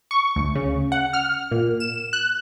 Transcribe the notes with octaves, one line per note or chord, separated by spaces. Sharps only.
C#6
D2
C#3
F#5
F6
A#2
E7
F#6